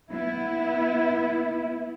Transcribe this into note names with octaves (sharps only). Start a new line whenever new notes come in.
B3 E4